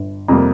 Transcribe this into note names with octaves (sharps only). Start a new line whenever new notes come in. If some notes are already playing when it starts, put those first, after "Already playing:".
Already playing: G1
F2 C3 G3 A#3 A#5